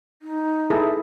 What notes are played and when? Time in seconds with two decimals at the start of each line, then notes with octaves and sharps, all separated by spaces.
0.22 D#4
0.70 E4 G#4 A4